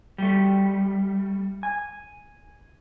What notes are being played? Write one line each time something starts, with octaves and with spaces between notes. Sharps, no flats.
G3 A3
G#5